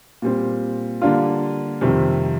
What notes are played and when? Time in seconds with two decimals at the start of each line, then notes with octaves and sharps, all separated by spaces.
0.22 A#2 G3 C4
1.02 D3 G3 A#3 D4 F4
1.81 F2 C3 D#3 G3